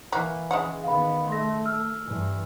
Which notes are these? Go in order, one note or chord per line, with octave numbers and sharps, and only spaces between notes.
E3 A#3 F#4
C#3 G#3 F#5
D#3 B3 F5 B5
A3 C6 A#6
E6 F6
G2 E3